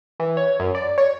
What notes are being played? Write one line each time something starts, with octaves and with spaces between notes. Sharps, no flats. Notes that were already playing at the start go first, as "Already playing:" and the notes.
E3
C#5
F#2
D5
C#5